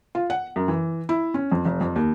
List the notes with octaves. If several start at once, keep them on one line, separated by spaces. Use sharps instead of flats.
F4
F#5
F#2
E3
E4
C#4
F2
F1
F2
D#2